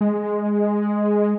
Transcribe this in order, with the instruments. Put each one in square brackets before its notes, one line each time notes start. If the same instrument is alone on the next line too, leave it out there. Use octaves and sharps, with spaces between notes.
[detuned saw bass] G#3